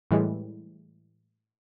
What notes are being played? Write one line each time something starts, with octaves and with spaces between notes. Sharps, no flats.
A2 E3 G3 G#3